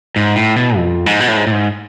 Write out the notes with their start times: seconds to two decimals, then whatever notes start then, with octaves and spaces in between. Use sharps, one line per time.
0.16 G#2
0.36 A2
0.56 B2
0.77 F2
1.06 G#2
1.20 B2
1.28 A2
1.37 G#2
1.47 A2
1.52 G#2